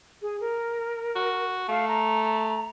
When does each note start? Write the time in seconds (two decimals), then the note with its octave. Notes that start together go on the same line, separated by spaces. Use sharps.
0.22 G#4
0.41 A#4
1.15 F#4
1.69 A3 F5
1.88 A#5